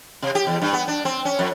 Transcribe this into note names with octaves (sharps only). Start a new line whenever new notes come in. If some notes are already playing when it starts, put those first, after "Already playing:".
C3
G4
E2
G2
B3
D4
C4
C#4
F2